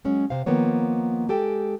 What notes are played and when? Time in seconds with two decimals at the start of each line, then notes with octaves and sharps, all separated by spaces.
0.05 F#3 G#3 C#4
0.30 C3 C5 F5
0.46 D#3 F3 A#3 B3 C#5
1.29 G#3 G4 A4 G5